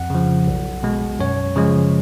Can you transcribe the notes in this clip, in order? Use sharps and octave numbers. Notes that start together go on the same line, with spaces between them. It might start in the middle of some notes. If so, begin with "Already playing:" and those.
Already playing: F2 F#5
C#3 F3
B1
B2 G#3
F#2 C#5
C#3 F3 G#3